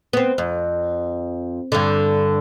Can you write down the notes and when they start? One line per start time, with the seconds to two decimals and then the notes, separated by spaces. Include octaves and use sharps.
0.13 B3 C4
0.38 F2
1.72 G2 D3